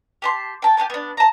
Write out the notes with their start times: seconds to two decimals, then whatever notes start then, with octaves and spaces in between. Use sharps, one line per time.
0.22 G4 A5 C6
0.62 G5 A5
0.77 G4 A#4 G#5 A5
0.90 B3 D4
1.17 A5 A#5